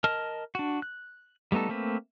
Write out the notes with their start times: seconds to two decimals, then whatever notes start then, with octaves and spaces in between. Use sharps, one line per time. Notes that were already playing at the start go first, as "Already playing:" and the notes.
0.04 A#4 D#5 A5 F6
0.55 D4 F#4
0.82 F#6
1.52 G3 A3 B3 D#4 A4
1.69 A3 A#3 C4 B4